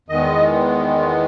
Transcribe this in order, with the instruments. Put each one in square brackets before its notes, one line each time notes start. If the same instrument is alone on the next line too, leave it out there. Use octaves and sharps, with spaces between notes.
[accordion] E2 D#3 G#3 B3 D#5